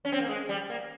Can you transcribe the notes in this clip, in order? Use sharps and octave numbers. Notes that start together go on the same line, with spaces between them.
C#4
C4
A#3
G#3
G3
A#3